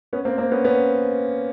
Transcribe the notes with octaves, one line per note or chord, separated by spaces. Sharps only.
B3 C#4
A#3 C4
A#3 C4
B3 C#4
B3 C#4